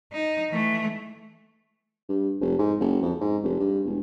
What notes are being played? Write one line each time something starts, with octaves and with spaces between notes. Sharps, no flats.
D#4
E3 A3
G2
F1
G#2
F#1
F2
G#2
F1
G2
E1